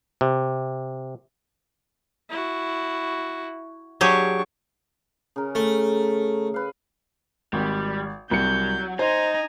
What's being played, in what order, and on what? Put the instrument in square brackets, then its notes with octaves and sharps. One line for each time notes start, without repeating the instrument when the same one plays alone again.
[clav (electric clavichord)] C3
[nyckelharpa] E4 F#4
[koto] F#3 G4 G#4 [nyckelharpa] D4 C#6
[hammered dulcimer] C#3 A#4
[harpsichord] A3
[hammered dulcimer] B4 F5
[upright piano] G#1 [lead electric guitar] G3
[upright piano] C2 C#7 [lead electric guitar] F#3 [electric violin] G6
[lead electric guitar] D#4 [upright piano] C5 [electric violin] G#5 A#5